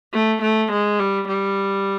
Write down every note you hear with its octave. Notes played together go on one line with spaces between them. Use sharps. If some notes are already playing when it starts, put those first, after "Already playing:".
A3
A3
G#3
G3
G3